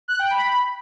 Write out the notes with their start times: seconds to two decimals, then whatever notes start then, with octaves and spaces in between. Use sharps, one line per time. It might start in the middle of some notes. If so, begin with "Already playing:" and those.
0.08 F#6
0.19 G5
0.31 B5